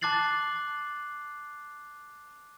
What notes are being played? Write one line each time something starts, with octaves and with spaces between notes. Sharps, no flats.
A5 D6 F#6 A6 C7 F#7